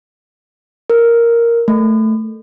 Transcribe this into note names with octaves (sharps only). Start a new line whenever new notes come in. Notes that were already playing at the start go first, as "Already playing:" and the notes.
A#4
A3